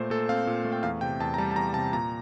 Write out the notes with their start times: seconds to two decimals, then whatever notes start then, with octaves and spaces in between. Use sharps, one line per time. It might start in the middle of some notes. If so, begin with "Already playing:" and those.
Already playing: A#2 A3 C5
0.10 A#2 A4
0.29 C4 F5
0.47 A#2
0.65 A3
0.72 G5
0.83 E2 F5
1.01 C3 G5
1.20 E2 A5
1.34 A#5
1.38 G3 A5
1.51 A5
1.56 E2 A#5
1.74 C3 A5
1.93 A#2 A#5